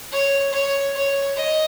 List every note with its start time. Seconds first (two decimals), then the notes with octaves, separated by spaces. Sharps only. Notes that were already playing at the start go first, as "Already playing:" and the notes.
0.12 C#5
0.52 C#5
0.95 C#5
1.36 D#5